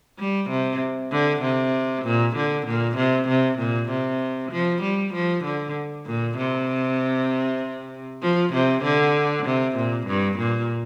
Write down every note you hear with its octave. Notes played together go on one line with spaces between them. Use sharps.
G3
C3
D3
C3
A#2
D3
A#2
C3
C3
A#2
C3
F3
G3
F3
D3
A#2
C3
F3
C3
D3
C3
A#2
G2
A#2